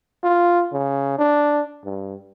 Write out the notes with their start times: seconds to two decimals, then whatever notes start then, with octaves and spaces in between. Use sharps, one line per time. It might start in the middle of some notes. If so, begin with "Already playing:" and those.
0.24 F4
0.73 C#3
1.19 D4
1.85 G2